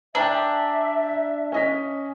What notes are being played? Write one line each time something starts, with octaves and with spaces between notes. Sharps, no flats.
D4 E5 G5 G#5 A#5
C#4 D#5 B6